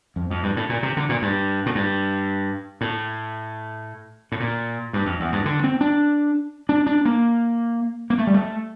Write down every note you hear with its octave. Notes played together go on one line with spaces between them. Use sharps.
F2
F2
G2
A2
A#2
C3
D3
A#2
G2
A2
G2
A2
A2
A#2
G2
F2
E2
G2
D3
C4
D4
D4
D4
A#3
A#3
A3
G3
A3